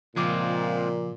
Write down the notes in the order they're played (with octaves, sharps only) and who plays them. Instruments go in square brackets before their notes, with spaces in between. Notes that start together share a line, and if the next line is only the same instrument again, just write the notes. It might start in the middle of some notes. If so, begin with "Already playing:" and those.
[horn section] A#2 [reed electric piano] C#3 F3 D6 [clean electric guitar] G#3 C4 F4